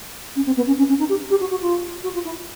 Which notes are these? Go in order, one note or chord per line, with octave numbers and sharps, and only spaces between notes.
C#4
C4
B3
C#4
C#4
C#4
D#4
G4
G4
F#4
F#4
F4
F#4
F4
E4